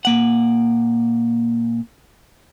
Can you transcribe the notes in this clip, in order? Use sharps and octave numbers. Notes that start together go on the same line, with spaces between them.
A#2 A#3 F#5